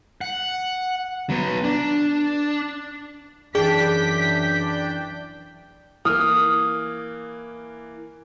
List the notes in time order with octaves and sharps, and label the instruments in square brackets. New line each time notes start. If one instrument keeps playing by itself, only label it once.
[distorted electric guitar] F#5
F#3 B3
D4
[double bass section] F#2 E3 [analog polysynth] D4 G5 [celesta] G#4 [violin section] B6
[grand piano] E3 A#3 [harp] D#6 F6